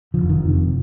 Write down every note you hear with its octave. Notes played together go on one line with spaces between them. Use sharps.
F1 D#2 D3 F3
D#3
F1 F2 C3